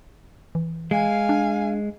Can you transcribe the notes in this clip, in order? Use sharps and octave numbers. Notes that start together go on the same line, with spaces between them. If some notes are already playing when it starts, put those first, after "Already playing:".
E3
G#3 F5 G#5
D4